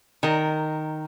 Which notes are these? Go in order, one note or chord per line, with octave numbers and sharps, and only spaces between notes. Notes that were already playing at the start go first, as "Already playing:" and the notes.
D#3 A#4